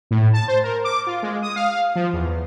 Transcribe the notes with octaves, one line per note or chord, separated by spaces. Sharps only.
A2
A5
C5
A#4
D6
F4
G#3
D#6
F5
F3
E2